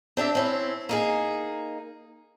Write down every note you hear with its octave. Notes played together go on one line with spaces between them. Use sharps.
C4 D4 G4 E5
C4 C#4 E4
A#3 D#4 G#4